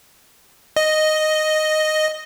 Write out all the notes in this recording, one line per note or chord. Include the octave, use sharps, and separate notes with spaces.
D#5